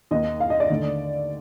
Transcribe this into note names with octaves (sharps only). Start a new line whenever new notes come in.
D#2 D#3 A#3 D#5
F5
D#5
D5
D#2 D3 A3